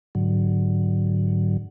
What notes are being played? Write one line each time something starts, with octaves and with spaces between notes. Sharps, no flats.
G#2 D3 F#3